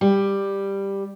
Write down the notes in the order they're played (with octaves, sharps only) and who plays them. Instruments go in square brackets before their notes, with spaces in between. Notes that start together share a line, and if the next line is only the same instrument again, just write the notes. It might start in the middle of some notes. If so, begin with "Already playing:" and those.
[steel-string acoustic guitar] G3